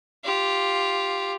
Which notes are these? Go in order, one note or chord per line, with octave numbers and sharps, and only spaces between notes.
F4 G4